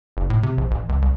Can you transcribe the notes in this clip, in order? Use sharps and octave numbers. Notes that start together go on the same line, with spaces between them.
F#1
A2
C3
A#1
A1
C#2
C2